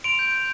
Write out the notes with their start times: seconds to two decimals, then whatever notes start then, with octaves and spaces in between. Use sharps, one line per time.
0.04 C6 D7 F7
0.19 G6
0.32 G6